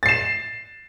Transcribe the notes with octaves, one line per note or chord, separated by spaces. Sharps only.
A6 C7 E7